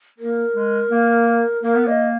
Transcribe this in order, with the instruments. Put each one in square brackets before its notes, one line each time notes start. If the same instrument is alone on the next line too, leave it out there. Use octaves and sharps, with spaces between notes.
[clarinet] A#3 [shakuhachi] A#4
[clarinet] G#3
A#3
[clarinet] A#3 [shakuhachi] A#4
[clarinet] B3
[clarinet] A#3 [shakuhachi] D#5